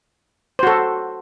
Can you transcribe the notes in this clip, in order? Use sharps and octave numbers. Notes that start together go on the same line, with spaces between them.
F#4 A4 C5